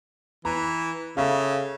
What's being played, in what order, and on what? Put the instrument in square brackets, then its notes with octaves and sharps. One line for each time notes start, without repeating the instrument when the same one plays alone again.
[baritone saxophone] E3 [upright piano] A#5
[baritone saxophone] C#3 [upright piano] A4 E5 F5